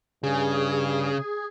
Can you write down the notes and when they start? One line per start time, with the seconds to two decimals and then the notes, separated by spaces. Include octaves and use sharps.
0.23 G2 C#3 G#4